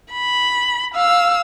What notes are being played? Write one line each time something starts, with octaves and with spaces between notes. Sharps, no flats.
B5
F5 E6